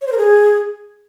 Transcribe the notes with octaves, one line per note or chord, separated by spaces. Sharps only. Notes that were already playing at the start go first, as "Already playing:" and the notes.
C#5
C5
A#4
G#4